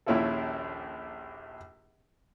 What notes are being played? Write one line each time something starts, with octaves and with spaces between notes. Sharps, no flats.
A#1 D#2 C#4 E4 F4 A4